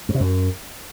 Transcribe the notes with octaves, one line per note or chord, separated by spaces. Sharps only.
G2
C3
F#2